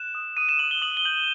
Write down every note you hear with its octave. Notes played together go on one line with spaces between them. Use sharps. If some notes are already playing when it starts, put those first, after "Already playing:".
Already playing: F#6 E7
D#6
D#6 D#7
E7
D#6 F#7
G7
D#6 F#7
G7
G6 F#7